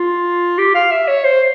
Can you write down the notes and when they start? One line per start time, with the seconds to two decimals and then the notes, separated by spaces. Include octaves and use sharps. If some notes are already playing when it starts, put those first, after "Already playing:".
Already playing: F4
0.58 G4
0.75 F5
0.91 E5
1.08 C#5
1.24 C5